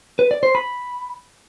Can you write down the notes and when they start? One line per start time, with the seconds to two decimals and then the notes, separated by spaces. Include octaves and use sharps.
0.19 B4
0.31 D5
0.43 C5
0.55 B5